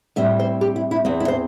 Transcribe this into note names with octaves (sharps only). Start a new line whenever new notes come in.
A2 G3 C4 E5
C5
G4
E4
E4
E2 E3 C4
E4
C5